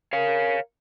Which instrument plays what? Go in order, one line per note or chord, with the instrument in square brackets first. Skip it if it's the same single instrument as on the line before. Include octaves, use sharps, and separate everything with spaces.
[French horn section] A#4 [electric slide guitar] C#5 F5